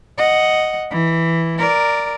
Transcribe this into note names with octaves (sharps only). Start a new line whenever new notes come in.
D#5 F#5
E3
A#4 D5